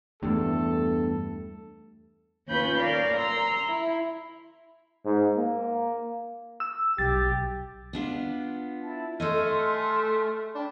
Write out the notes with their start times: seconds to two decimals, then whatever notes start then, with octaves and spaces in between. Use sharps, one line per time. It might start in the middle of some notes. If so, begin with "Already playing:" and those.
0.23 E2 G2 A3 A4
2.46 D#2 C#4 F4 B4 B5 G6
2.79 A#4 D5 F5
3.16 A#5 C6 E6
3.68 E4
5.05 G#2
5.36 A#3
6.60 E6
6.98 B1 G4 A6
7.93 B3 D4 F4
8.83 E4 A5
9.20 A3 A4 C#5 D#5 G#5 C6 F6
10.55 D4 G5 B5